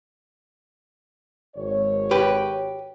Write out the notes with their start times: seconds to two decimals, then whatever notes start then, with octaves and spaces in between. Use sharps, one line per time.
1.56 G#1 C#5
2.11 G4 B4